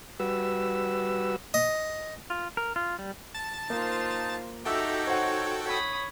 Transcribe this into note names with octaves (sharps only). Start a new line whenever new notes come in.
G3 F#4 B4 E6
D#5
F4
A#4
F4
G3
A5 A6
A#3 D#4 F4 C5
D#4 F#4 G4 A4 E5 G5 E6
C5 C#5 F#5
C#5 B5 D#6